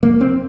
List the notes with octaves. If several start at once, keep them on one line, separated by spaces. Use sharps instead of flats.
F1 A#3
F1 C4